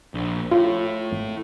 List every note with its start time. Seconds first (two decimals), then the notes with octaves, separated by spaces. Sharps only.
0.14 A#1
0.51 A2 F4
1.11 A1